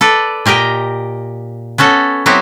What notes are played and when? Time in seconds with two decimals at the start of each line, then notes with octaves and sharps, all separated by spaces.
0.01 A4 B4 D5
0.46 A#2 G4 A#4 D#5 G5
1.78 B3 C#4 F#4 A4
2.26 F#3 B3 C4 E4 F#4 G4